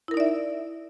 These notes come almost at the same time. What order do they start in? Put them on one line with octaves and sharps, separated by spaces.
E4 A#4 D#4 D5 E5